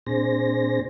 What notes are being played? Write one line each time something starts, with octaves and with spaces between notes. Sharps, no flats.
A#2 C4 D4 G#4 C5 A#6